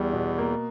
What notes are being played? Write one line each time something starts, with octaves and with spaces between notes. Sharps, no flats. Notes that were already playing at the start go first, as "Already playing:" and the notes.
Already playing: E2 G3
B2
A#3